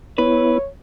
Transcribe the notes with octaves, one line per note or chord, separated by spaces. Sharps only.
B3 E4 B4 C#5